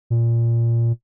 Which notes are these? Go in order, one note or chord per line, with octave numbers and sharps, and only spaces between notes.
A#2